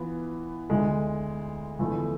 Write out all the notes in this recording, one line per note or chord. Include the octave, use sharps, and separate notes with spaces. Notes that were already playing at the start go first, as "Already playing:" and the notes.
Already playing: E3 B3 F4
D2 D3 G#3
E2 D3 F3 A3 E4